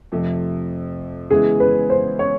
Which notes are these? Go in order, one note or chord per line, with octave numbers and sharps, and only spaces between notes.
F2 C3 F3 A3 C4
C#3 E3 G#3 B3 E4 G#4
B4
C5
C#5